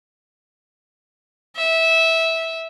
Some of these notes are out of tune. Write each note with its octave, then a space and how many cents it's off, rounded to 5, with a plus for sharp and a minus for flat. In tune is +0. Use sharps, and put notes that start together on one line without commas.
E5 -15